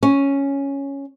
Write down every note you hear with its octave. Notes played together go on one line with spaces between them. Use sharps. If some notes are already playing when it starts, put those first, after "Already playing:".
C#4